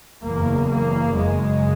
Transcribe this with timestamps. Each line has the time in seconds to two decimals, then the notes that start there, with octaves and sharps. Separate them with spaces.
0.22 F#1 E2 C#3 A#3
0.69 A#3
1.14 F#1 F#2 C#3 G#3